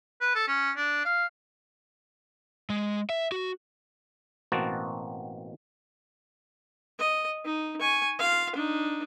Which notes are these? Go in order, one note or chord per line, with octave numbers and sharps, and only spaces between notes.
B4
A4
C#4
D4
F5
G#3
E5
F#4
A1 B2 A#3 C4 F#4 A5
D#5
D#4
G#5 C#6
F4 F5
D4 D#4